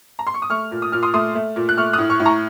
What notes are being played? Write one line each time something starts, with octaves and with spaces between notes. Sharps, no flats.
A#5
C6
C#6
D#6
A3 C#6 F6
A#2
D#6
A#2 F6
C6 D#6
A3 C6 D#6
A3
A#2
F#6
A3 C#6 F6
D#6 F#6
A2
C#6 F6
A2
A#5 C#6